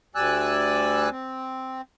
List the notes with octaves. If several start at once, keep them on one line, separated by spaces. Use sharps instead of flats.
D2 G3 D5 G#5 E6 F#6
C4